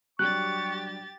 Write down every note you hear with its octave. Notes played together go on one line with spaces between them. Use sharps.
F#3 G3 D4 G4 C#6 F#6 A6